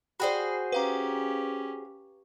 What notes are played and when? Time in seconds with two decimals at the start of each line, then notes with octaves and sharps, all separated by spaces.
0.20 F#4 G#4 C5 D5 G5 B5
0.72 C#4 G4 B4 F5 A#5